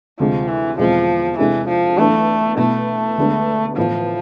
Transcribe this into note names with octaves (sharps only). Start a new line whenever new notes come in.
D2 C3 F3 G#3
E3
E2 B2 F3 G#3 C4
C3 E3 G#3 D4 A4
F3
E3 A3 B3 D4 A4
B2 A3 B3 E4
D2 D3 G#3 B3 D4
A2 E3 F3 B3 E4